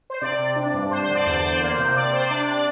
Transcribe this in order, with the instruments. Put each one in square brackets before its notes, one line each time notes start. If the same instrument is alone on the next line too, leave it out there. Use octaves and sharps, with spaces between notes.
[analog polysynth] C5
C3 D5
C3
D4
G2
D4 C5
C5
D3
D5
E2 C5
D5
E2 C5
A#3
C3
C3 D5
C3 C5
D4 D5
D5
D5